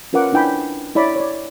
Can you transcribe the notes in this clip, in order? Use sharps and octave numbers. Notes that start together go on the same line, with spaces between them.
C#4 F4 A#4 B4 F#5 D6
D4 E4 B4 G5 G#5 B5
E4 C#5 D5 B5
C#5 D5